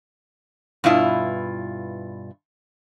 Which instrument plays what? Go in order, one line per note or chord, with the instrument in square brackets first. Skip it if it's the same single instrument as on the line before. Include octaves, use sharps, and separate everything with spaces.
[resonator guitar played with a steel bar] G2 B2 E4 F4